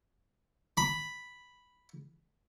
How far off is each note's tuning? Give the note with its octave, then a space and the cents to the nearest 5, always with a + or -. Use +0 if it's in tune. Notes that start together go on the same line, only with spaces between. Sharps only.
B5 +0